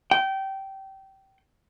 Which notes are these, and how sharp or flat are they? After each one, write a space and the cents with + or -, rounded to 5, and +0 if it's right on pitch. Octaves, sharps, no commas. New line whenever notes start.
G5 -20